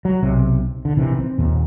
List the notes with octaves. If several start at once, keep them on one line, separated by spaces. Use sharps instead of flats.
F#3
B1 C3
D3
A#1 C3 D#3 E3
C4
D#2 A#2